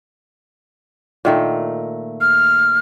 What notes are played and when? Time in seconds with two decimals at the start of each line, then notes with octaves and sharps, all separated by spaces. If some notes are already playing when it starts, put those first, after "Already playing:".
1.25 A#2 D#3 A3
2.21 F6